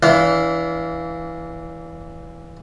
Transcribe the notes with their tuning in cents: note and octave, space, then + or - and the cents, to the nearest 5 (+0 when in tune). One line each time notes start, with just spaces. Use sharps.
E3 +0 D4 -40 F5 -5